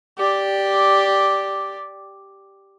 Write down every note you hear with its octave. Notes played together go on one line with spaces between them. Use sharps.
G4 D5